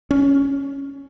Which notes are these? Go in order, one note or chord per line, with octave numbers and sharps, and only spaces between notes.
C#4